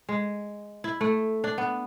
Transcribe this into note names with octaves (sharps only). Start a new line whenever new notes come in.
G#3
E4
A3
D4
B3